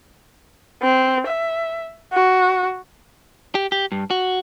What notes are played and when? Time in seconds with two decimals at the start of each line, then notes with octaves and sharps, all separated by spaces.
0.83 C4
1.27 E5
2.13 F#4
3.55 G4
3.72 G4
3.92 G2
4.10 F#4